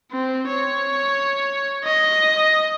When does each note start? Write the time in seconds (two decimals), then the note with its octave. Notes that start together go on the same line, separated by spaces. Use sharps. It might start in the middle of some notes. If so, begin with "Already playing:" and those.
0.12 C4
0.48 C#5
1.84 D#5